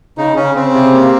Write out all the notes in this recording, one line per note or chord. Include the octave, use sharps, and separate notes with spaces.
C#3 D#4
C#3 C#4
C#3 C4
C3
A#3